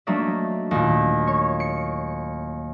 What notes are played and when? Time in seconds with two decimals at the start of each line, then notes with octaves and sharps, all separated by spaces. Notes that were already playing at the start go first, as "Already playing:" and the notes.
0.07 F#3 A3 A#3 D4 D#4 E5
0.71 D#2 A#2
1.27 C#5
1.60 C#7